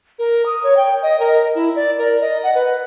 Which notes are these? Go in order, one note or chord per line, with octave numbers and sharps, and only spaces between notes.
A#4
D#6
C#5
G5
D#5
A#4
E4
D5
A#4
D#5
F#5
B4